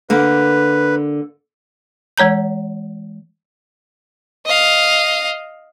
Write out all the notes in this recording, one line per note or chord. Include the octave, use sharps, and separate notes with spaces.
D3 A#3 B4
E3 G#3 C#5 A#5 G6
D#5 F5